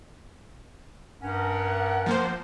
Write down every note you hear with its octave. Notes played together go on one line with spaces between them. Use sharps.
G2 C#4 A#4 F#5
F3 A#3 C5